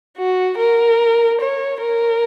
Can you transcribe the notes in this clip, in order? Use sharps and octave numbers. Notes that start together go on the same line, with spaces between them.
F#4
A#4
C#5
A#4